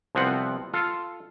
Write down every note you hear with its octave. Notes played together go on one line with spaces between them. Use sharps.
C2 F3 B3 C4 F#5
F4 A4